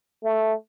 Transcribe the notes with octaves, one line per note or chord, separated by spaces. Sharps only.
A3